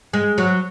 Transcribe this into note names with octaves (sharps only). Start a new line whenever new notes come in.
G#3
F#3